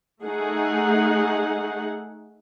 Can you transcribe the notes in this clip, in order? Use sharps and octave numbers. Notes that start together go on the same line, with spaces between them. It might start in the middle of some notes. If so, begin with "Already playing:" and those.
A3 D#4 G#4 F#5